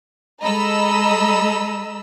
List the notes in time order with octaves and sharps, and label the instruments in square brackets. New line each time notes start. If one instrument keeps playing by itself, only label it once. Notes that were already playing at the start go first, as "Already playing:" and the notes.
[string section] G#3 A4 D#5 A#5 B5 E6